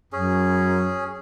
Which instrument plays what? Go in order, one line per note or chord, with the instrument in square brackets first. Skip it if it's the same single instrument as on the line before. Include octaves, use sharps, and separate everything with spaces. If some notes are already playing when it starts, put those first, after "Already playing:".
[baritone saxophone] F#2 [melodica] C#4 G#4